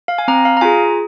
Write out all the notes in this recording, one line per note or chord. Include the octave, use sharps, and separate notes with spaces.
F5
G#5
C4 A#5
F5
A#5
F4 G#4 G#5